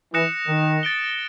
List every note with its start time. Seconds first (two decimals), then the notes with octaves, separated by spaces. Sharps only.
0.13 E3 D#6 F#6 A#6 C#7 E7
0.47 D#3
0.83 A6 D7 G7